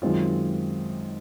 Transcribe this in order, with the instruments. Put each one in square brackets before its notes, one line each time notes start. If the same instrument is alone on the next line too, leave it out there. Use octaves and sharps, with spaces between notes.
[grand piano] F#2 D#3 G#3 C4 F4